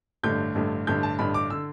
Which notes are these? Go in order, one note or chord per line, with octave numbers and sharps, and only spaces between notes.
A1 G2 D3 A3 G6
A1 G2 D3 A3
A1 G2 D3 A3 G6
A5
A1 G2 D3 A3 B5
D6
D3 E6